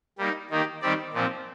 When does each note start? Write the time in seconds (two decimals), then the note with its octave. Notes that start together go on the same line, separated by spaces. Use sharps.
0.18 G3 A#3 D#4
0.50 D#3 A#3 D#4 G4
0.81 D#3 G3 C4 G4 D5
1.13 A#2 F3 C4